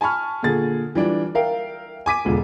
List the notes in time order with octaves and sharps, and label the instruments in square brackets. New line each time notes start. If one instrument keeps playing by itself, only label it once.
[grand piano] G#5 A5 B5 C#6 F6
A#2 D3 G#4 A6
E3 G3 D4 F4
A#4 E5 F5 G5
G#5 D6 B6 D#7
E1 C#2 D3